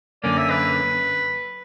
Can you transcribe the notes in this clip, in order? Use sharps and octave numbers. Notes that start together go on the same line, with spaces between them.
F#2 D3 A#3 C#4 D5
E5
B4